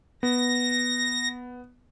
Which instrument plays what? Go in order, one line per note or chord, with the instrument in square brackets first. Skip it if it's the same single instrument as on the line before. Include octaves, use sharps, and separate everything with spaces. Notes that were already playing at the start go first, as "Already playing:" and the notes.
[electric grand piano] B3 [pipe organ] A#6